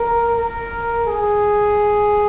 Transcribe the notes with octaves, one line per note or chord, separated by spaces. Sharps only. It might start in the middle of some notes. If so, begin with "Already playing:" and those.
Already playing: A#4
A#4
G#4